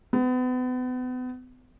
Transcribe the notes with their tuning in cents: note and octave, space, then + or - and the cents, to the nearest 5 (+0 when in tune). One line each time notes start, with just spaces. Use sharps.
B3 +35